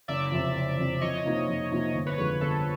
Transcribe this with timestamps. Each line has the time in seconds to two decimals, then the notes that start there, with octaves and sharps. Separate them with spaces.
0.08 F#1 D5 E5
0.32 F2 C3
0.55 F#1
0.78 F2 C3
1.01 F2 C#5 D#5
1.24 C3 F3 A#3 D#4
1.48 F2
1.71 C3 F3 A#3 D#4
1.94 G1
2.06 B4 C#5
2.18 F2 D3 F3 G#3 B4 C#5
2.30 B4 C#5
2.41 G1 A4 B4